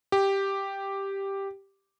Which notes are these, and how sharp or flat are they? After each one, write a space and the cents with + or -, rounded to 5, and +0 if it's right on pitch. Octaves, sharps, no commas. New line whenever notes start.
G4 +0